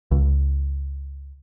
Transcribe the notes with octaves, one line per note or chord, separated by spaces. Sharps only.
C#2